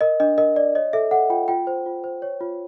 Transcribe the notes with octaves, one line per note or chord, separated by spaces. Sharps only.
A#4 D#5
D4 D#5
A#4 D#5
D5
C#5 D#5
A4 E5
A4 F#5
F4 G5
F4 G5
C5
F4
C5
C#5
F4